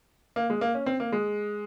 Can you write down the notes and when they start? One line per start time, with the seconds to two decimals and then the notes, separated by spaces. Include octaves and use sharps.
0.36 A#3
0.50 G#3
0.61 A#3
0.74 C#4
0.86 C4
1.00 A#3
1.12 G#3